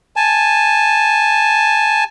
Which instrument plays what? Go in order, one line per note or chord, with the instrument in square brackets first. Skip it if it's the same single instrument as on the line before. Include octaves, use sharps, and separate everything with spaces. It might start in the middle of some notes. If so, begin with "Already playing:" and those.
[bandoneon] G#5 A5